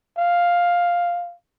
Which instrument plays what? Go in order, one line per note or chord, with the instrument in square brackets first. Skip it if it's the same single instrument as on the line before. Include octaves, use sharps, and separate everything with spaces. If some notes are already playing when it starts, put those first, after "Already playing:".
[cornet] F5